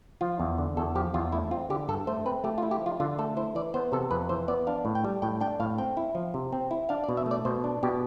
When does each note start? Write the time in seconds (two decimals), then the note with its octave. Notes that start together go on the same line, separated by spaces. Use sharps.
0.21 F3 F4
0.40 E2
0.58 D3
0.77 E2 A4
0.95 F3 G4
1.14 E2 F4
1.32 A3 E4
1.51 C4 F4
1.70 D3 G4
1.88 G2 A4
2.07 A3 C5
2.26 C4 B4
2.44 A3 G4
2.58 F4
2.63 E4
2.71 G4
2.81 F3 F4
3.00 D3 F4
3.18 A3 A4
3.37 E4 C5
3.55 E3 D5
3.74 B3 C5
3.92 C3 A4
4.11 F2 B4
4.29 E3 C5
4.48 B3 D5
4.67 D4 F5
4.85 A2
4.95 G5
5.05 G3
5.22 A2 G5
5.40 D4 G5
5.60 A2 F5
5.78 C4 G5
5.97 E4
6.15 F3
6.34 C3
6.53 C4
6.71 E4
6.89 D4 F5
7.04 D5
7.09 B2
7.17 E5
7.26 A3 D5
7.45 B2 C5
7.64 D4
7.83 B2 G4